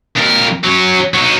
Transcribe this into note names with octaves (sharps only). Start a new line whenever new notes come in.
F2 A#4
F#3 C#4
F#3 D#4